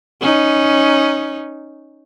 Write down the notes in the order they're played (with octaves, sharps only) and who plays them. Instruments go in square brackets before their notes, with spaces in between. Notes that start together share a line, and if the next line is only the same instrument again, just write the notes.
[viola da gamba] C#4 D#4